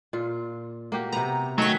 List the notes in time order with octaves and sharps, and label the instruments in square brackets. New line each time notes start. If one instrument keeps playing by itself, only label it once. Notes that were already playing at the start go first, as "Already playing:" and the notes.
[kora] A#2 F4
A#3 F#4 G4
[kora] C3 B3 [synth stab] A#5
[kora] D#3 C#4 [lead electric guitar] F#3 [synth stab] A3 B6